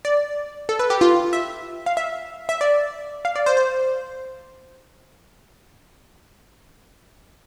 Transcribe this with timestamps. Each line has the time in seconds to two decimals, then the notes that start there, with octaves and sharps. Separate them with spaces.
0.05 D5
0.69 A4
0.79 B4
0.90 G4
1.01 F4
1.33 E5
1.86 F5
1.97 E5
2.49 E5
2.61 D5
3.25 F5
3.36 D5
3.46 C5
3.57 C5